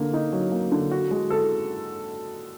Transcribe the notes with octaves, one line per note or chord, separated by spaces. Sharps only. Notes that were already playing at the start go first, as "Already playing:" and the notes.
Already playing: D3 A#3
D#4
F#3
A#3
D3
F#4
G#3
A4